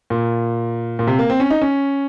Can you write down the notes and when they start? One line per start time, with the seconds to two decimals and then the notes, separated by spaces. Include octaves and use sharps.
0.10 A#2
0.99 A#2
1.07 C3
1.19 A#3
1.30 C4
1.40 C#4
1.50 D#4
1.62 C#4